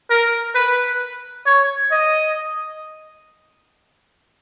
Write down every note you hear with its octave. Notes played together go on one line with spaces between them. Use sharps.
A#4
B4
C#5
D#5